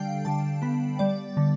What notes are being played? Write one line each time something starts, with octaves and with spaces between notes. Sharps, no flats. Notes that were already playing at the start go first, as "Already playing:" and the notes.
Already playing: D3 G3 F5 G5
D3 A5
B3 B5
G3 D5
D3